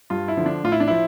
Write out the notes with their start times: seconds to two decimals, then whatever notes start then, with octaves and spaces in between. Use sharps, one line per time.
0.10 G2 F4
0.28 E4
0.37 D3 F3
0.46 D4
0.64 A2 F4
0.72 E4
0.80 D4
0.88 F3 E4